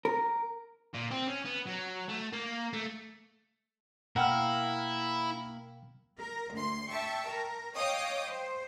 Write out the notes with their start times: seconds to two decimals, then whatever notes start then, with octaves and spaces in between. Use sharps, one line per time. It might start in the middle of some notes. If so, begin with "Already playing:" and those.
0.05 A#4
0.94 A#2
1.11 C4
1.28 C#4
1.45 B3
1.67 F#3
2.09 A3
2.33 A#3
2.73 A3
4.16 B2 A#3 E4 A#4 F#5 G5 F6
6.17 A#4
6.53 D2 C6
6.91 E5 G5 A5 C#6
7.28 A#4
7.76 C#5 D#5 F5 G5 D6 D#6
8.25 C5